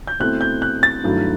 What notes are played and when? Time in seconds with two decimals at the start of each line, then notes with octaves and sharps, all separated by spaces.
0.07 G6
0.20 B2 A3 C4 E4 F#6
0.41 G6
0.62 F#6
0.83 A6
1.03 G2 D#3 F#3 A3 E4